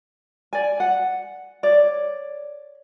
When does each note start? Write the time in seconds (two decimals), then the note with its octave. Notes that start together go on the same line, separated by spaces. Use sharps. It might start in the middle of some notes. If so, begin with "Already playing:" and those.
0.53 D5 G#5
0.80 F#5
1.63 C#5 D5